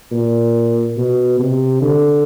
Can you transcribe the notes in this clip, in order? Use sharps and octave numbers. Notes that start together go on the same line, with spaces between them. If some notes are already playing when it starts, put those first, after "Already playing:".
A#2
B2
C3
D3